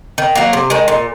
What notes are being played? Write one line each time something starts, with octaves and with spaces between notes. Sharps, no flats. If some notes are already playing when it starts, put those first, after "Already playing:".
D#3
F#3 A#3
C3
D#3 G#3
A#2